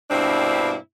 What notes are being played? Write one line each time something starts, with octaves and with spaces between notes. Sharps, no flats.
G2 B2 A#3 C4 D4 E4